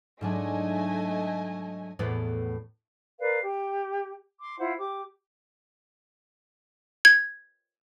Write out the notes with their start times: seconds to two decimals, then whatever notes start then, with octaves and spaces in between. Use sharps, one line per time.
0.21 G#2 F#3 A3 D4 D#5 G#5
1.99 E2 A2 B3
3.20 A#4 B4 D5 F5
3.42 G4
4.40 C6 D6
4.59 E4 F4 C5 F#5
4.79 G4 D6
7.05 G#6